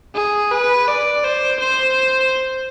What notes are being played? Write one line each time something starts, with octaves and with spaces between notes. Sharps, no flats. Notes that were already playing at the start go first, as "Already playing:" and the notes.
G#4
B4
D5
C5
C5